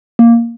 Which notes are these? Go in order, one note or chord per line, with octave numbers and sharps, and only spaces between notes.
A#3